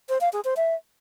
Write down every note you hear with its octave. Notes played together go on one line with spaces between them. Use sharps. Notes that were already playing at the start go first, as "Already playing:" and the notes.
C5
F5
G#4
C5
E5